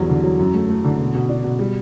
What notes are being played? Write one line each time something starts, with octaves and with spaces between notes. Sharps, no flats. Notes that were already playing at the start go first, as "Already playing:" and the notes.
Already playing: E2 F#3 G3
D3
F#3
F#2
A3
A3
D3
B2
B2
D4
B2
G3